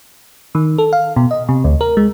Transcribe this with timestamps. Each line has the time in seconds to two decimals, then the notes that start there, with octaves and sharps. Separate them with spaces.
0.55 D#3
0.78 A4
0.93 F5
1.16 B2
1.31 D#5
1.49 C3
1.64 D2
1.81 A#4
1.97 G#3